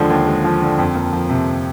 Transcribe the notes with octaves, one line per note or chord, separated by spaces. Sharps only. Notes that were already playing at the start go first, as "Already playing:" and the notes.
Already playing: D#2 D3 F3 G#3
D#2
G#3
F3
D3
F2
A#3
F3
C3